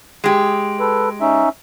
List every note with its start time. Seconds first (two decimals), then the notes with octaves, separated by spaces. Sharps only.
0.24 G#3 G4
0.80 A4 B4
1.21 C#4 D#4 E5